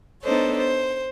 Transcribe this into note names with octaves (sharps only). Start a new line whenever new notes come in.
B3 D4 D#4 A4 C5 C#5
C5